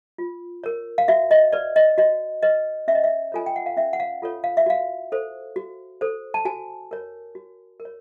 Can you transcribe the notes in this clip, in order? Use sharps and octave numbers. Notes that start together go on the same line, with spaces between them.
F4
A#4 C#5
F5
F#4 E5
D#5
B4 D5
D#5
F#4 D#5
B4 D#5
C#4 E5
D#5
E5
F4 A4 C#5 G#5
G5
F#5
F5
C#4 E5
F#5
F5
F4 A4 C#5
F5
E5
F#4 F5
A4 C5
F#4
A4 C5
A5
F#4 G#5
A#4 C#5
F#4
A#4
C#5